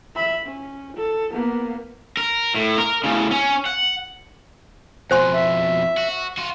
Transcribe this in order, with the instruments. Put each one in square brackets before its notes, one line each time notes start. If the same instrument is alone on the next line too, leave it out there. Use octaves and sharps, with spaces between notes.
[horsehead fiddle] E5 B5
C#4
A4
A#3 B3
[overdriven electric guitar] A#4
A2
A#4
A2 C#3
C#4
F#5
[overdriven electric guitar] F2 B2 [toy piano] C5 G#5 C6
[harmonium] E5
[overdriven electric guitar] F#4
F4 F#4